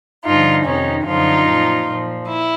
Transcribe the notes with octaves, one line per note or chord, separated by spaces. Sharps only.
G2 D3 F3 D#4 F4
F2 C3 D#3 C#4 D#4
F#2 D3 F3 D#4 F4
A#2 F3
A#2 F3
E4